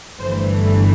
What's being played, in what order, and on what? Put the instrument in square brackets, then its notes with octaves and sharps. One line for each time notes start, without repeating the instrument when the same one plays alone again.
[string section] G1 G2 E3 A3 C5